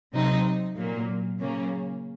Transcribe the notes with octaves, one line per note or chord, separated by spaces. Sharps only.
C3 F#3 C4 D#4
A#2 F#3 A#3
C#3 F#3 A#3 C#4